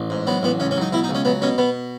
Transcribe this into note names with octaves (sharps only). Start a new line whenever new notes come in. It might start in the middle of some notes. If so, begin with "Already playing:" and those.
Already playing: A1
G#2
F#3 B3
A1 B3
C#2 C#4
C#4
F#3
D#4
B2 E4
D#4
C#2
C#4
F#3 B3
B2 C#4
B2 B3